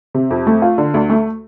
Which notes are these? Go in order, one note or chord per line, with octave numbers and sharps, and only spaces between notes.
C3
F2
A3
F4
D3
D2
A3